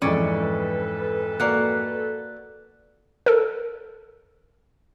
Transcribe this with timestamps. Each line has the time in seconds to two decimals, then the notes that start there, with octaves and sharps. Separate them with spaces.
0.02 F2 G#2 E3 C#4 A4 B4 D5
1.40 A#3 F#4 D5 F#6
3.26 A4 A#4